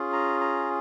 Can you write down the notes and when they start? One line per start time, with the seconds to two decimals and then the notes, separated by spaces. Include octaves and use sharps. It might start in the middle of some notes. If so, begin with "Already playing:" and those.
Already playing: C#4 F4 G#4
0.13 A#5
0.41 A#5